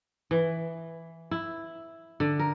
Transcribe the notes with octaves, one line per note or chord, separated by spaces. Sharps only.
E3
E4
D3
A#4